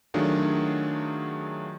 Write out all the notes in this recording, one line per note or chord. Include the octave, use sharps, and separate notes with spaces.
D#3 F#3 A3 D4 F4 G#4